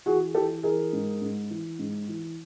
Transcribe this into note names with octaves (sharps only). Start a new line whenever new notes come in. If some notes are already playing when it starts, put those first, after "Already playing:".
E3 F#4 G#4
E3 G4 A4
E3 G#4 A#4
G#2
G#2
E3
G#2
E3